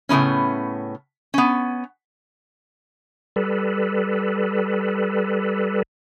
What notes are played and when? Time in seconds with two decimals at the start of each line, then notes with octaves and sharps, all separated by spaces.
0.09 A2 C#3 F3 B3 C#4
1.34 B3 C#4
3.36 G3 A4 B4